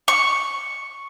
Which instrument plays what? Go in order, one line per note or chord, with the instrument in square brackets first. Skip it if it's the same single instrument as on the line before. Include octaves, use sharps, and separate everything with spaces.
[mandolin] C#6